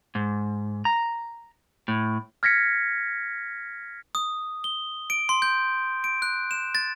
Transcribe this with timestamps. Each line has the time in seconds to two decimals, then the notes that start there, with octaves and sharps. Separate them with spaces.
0.15 G#2
0.85 A#5
1.88 A2
2.43 F6 G#6 A#6 B6 C#7
4.15 D#6
4.64 G7
5.10 D7
5.29 C6
5.42 G6
6.04 D7
6.22 F#6
6.51 E7
6.75 A6